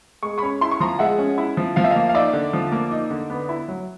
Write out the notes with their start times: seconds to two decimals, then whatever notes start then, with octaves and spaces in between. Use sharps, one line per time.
0.23 G#3 C#6
0.38 C#4 B5 C#6
0.61 E4 C6
0.71 C#6
0.80 F3 A#5 C6
0.99 G#3 E5 F#5
1.19 C#4
1.38 E4
1.57 F3
1.76 F3 F5
1.84 E5
1.91 A#3 D#5 F5
2.09 F5
2.14 D#4 D5 E5
2.33 D3
2.53 F3
2.72 A#3
2.91 D#4
3.10 D3
3.30 B3
3.49 E4
3.68 F#3